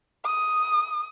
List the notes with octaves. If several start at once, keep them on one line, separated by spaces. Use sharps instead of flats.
D#6